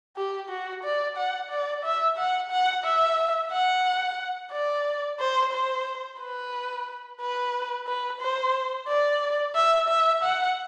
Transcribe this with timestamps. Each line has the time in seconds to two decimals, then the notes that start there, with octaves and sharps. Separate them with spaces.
0.17 G4
0.49 F#4
0.84 D5
1.17 F#5
1.50 D5
1.84 E5
2.17 F#5
2.51 F#5
2.85 E5
3.52 F#5
4.52 D5
5.20 C5
5.53 C5
6.20 B4
7.21 B4
7.87 B4
8.21 C5
8.88 D5
9.55 E5
9.88 E5
10.23 F#5